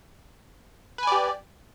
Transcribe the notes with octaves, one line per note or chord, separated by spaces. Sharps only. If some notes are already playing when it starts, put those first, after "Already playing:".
G4 B4 D5 G#5